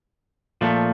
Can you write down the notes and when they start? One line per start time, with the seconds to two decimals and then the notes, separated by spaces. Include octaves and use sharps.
0.61 A#2 F3 A3